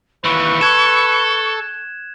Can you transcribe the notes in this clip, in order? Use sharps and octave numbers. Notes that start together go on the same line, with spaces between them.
D#2 E3 B4 C#6
A4 F#6 G#6 E7